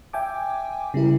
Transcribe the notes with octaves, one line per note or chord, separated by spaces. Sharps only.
E5 G5 G#5 D6
C#3 G3 E4 A#4